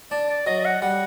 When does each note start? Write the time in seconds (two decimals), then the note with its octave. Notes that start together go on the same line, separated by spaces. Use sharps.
0.11 D4 D5
0.29 D5
0.46 F#3 D#5
0.60 D#5
0.65 F#5
0.82 G3 F#5